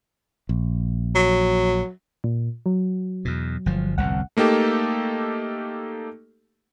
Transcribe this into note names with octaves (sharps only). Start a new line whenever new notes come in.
A#1
F#3
A#2
F#3
E2 B2
G1 F3
G1 C2 F2 F#5
A3 A#3 D#4 G4 A4